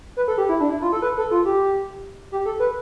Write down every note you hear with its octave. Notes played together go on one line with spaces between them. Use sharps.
B4
A4
G4
E4
D4
E4
F4
A4
B4
A4
F4
G4
G4
A4
B4